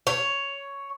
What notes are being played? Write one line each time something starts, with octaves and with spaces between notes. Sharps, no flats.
C#5